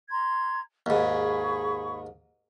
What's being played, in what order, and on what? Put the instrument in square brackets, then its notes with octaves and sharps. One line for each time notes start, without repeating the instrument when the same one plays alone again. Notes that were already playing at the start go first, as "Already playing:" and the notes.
[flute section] A#5 C6 G#6
[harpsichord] D#2 G#2 [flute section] G#4 B5 C#6